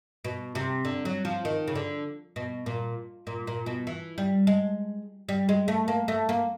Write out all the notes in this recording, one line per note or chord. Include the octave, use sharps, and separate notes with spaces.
B2
C3
D3
F#3
F3
D#3
C#3
D3
B2
A#2
A#2
A#2
B2
E3
G3
G#3
G3
G#3
A3
A#3
A3
A#3